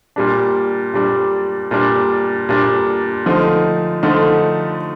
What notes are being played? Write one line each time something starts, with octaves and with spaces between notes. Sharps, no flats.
A#2 G3 D4
A#2 G3 D4
A#2 G3 D4
A#2 G3 D4
D3 F3 A3 D#4
D3 F3 A3 D#4